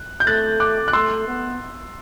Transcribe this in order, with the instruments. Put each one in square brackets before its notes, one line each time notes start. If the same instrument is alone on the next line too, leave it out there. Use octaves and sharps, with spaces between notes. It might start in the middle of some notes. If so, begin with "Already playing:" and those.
Already playing: [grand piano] F#6
G6
[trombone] A3 [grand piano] F#6 A6
[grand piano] D6 F#6
F#6
[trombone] A3 [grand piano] C6 E6
[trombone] B3